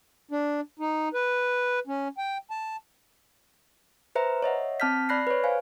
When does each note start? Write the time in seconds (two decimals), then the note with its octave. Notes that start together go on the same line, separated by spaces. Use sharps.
0.31 D4
0.79 D#4
1.14 B4
1.87 C#4
2.18 G5
2.51 A5
4.15 B4 C5 E5 A#5
4.42 C#5 D#5 E5 F#5
4.80 C4 A5 F6 G6 B6
5.09 D5 B5 F#6 A#6 C7
5.27 B4 C#5
5.44 C5 F5 G#5